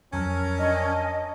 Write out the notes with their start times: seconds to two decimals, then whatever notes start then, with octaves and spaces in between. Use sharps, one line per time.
0.13 F2 F#3 C#4 A4 A#4
0.59 D4 D#5 C#6